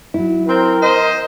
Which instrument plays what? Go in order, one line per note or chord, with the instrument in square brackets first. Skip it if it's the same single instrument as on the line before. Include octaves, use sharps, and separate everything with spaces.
[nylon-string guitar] F#3 E4
[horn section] C4 [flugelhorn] A#4
[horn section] C5 D#5